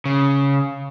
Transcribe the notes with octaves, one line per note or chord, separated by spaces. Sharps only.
C#3